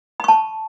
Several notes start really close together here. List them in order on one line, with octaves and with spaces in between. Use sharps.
B5 C#6 A5